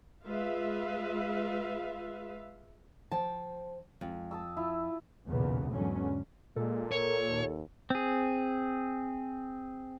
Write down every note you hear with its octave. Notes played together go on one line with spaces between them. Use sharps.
G#3 F4 B4 E5 F5
F3 C5 G5 A5
F2 G#3
A5 D#6 E6
E4 F4
B1 E2 A#2 C#3 B3
E2 G#2 D3 F#3 C#4
A#2 G#3 A4
A#4 C#5
D#2
C4 G#4